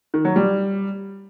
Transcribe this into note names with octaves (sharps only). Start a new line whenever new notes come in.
D#3
F#3
G3